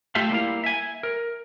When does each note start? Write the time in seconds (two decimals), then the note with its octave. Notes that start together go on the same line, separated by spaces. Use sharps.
0.15 A3 F4 G4 A4 E5 F5
0.30 G3 A#3 E4 F5
0.64 E5 G#5
1.03 A#4